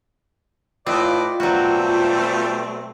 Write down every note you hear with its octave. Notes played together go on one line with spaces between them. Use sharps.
A2 C4 F4 B4 D5 D#5
B2 F#3 G3 A3 C4 F#4